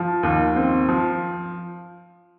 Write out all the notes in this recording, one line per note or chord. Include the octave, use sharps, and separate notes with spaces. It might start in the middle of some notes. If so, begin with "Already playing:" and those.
Already playing: F3
D#2
C4
F3